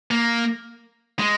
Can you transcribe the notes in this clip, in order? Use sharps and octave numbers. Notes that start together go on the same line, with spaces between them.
A#3
G#3